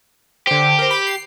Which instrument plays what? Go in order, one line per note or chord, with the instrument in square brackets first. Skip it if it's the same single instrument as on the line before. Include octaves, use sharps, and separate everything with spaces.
[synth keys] D3 C5 [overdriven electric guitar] G4
[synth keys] A#4 C5
B5
C7